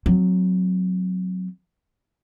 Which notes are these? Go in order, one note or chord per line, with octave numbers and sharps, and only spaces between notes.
F#3 C4